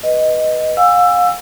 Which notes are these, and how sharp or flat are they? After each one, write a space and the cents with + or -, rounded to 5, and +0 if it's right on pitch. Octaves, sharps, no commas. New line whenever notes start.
B4 +0 D#5 +0
F5 +35 G#5 -45 E6 +15